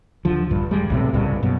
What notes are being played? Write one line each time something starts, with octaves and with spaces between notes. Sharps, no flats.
D#2 D3 F3
A#1 G2
D#2 G3 G#3
B1 A2 C3
C2 G2 A#2 C#3
F#2 B2